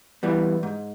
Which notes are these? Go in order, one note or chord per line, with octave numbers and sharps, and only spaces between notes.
E3 G3 B3
G#2